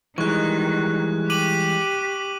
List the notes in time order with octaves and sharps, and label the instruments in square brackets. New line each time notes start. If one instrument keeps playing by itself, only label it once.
[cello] D#3 [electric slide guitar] E3 G3 G#3 [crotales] C#6 F#6
[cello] G4 [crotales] D6 D#7 F#7